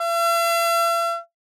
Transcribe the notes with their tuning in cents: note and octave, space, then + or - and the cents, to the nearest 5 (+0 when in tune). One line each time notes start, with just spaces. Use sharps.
E5 +45